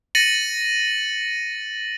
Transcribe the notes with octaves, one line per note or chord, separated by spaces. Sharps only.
A6 A#6 C#7 D#7 F#7